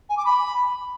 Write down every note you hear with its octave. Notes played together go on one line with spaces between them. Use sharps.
G#5
D6
B5